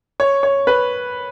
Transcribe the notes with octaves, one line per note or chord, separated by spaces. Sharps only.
C#5
C#5
B4